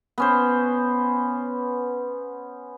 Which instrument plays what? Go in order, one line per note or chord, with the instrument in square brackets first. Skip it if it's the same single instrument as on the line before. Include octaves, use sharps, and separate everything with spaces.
[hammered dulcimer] B3 C#4 C5